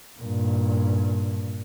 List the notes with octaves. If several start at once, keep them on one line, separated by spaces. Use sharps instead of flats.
G2 A#2